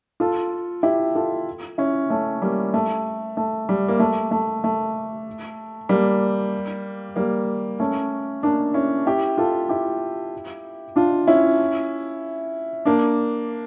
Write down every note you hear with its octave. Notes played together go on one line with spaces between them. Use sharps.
F4 A4
E4 G4
F4 A4
C#4 E4
A3 C#4
G3 A#3
A3
A3
G3
A#3
A3
A3
A3
G3 A#3
G3 A#3
A3 C#4
A#3 D4
C#4 E4
E4 G4
F4 A4
E4 G4
D4 F4
C#4 E4
A#3 D4